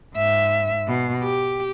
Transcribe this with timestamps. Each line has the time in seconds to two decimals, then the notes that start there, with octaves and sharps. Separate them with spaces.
0.14 G#2 E5
0.87 B2
1.23 G4